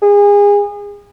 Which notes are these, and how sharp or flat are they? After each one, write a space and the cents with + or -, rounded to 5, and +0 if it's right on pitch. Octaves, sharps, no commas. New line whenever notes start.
G#4 -30